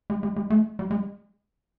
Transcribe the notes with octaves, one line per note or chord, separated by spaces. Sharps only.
G#3
G#3
G#3
A3
G3
G#3